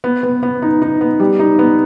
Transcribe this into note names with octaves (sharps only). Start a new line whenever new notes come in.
B3
B3
B3
D#4
D#4
B3
G3
D#4
B3